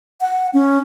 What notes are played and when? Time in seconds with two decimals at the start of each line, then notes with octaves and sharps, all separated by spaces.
0.21 F#5
0.54 C#4